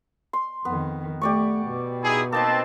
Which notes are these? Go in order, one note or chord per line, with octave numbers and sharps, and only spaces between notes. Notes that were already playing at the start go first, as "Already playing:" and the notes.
C6
F2 D#3 B3
A3 G4 D5 C#6
B2
D#4 E4 G#4
A#3 C4 D#4 B4 A5